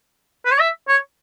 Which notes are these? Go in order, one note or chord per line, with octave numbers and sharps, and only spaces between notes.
B4
C#5
E5
C#5